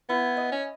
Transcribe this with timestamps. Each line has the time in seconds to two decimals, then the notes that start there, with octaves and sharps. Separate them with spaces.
0.09 B3 E4
0.37 D#5
0.52 C#4